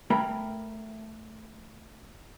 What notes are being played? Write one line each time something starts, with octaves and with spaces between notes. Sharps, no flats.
A3 A#4 G5 A#5 B5